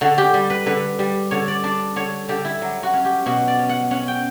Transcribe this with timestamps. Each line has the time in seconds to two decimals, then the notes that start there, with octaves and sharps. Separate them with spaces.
0.01 D3 F#4
0.18 G4
0.34 G3
0.50 B4
0.66 D3 B4
0.99 G3
1.31 D3 C#5
1.48 D5
1.64 D4 D5
1.96 D3 C#5
2.29 D3 G4
2.45 E4
2.61 F#3
2.83 F#4
2.94 C#4
3.05 G4
3.26 B2 F#4
3.48 D5
3.59 C#4
3.69 F#5
3.91 C#4 F#5
4.08 G5